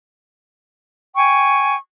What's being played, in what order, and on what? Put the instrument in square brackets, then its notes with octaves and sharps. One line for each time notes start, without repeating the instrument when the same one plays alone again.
[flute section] G5 G#5 C#6